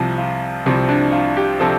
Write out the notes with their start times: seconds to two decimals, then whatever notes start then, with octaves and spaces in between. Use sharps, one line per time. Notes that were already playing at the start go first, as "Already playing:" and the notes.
Already playing: C2 C3 F3
0.18 F4
0.66 C2 C3 F3 C4
0.89 D4
1.12 F4
1.37 G4
1.60 C3 F3 A4